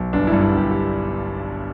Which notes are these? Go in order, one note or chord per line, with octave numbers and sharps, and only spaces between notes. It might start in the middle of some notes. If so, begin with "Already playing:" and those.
Already playing: B1
G1 D4
E4
G2
E4
G1 G4
G4